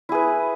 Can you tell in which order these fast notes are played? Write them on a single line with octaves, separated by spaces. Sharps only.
E4 G#4 B4